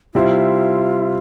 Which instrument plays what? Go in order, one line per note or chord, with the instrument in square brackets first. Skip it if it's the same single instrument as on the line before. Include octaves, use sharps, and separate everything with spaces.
[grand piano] C3 G3 C4 E4 [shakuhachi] F4